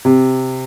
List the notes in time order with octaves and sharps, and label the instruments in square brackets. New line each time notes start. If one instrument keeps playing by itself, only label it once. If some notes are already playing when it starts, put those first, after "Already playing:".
[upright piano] C3